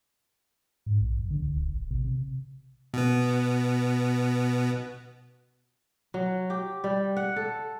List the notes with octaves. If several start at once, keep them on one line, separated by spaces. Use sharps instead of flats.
G#2
A#1
F#2
D3
C#2
D1
A1
C3
C3
B2 B3
F#3
G4
G3
F#5
A4